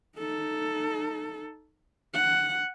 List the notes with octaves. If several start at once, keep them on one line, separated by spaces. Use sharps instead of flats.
D#4 A4
F#5